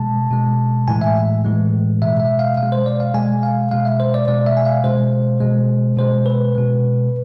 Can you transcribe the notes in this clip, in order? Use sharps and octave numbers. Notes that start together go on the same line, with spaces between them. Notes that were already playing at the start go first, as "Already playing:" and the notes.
Already playing: B2 G#3 A5
B2 G#3
A2 E3 G#3 G#5
E5
A2 E3 G#3
B2 G#3 E5
E5
F5
B2 F5
G#3
C5
D5
F5
B2 G#3 G#5
F5
B2 G#3 F5
E5
C5
D5
B2 G#3 D5
E5
G#5
F5
B2 G#3 C5
B2 G#3
B2 G#3 C5
B4
B2 G#3